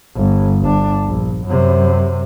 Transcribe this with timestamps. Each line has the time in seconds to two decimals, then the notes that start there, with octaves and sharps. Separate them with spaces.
0.16 G1
0.61 G1 D4
1.06 A#1
1.46 F#2 C3